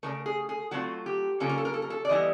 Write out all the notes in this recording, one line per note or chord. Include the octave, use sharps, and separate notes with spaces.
C#3 F3 A3 A#4
G#4
G#4
F#3 A3 C4 F4 F#4
G4
C#3 F#3 A#3 C#4 F4 A4
A#4
A4
A#4
A4
A#4
A4
D5
E3 G3 B3 E4 D#5